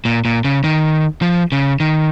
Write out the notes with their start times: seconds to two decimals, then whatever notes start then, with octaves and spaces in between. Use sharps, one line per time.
0.05 A#2
0.25 A#2
0.44 C#3
0.64 D#3
1.22 F3
1.52 C#3
1.80 D#3